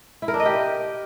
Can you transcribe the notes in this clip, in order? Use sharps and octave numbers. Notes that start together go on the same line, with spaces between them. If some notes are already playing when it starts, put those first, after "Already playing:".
E4
A#4
D4
D#5
G4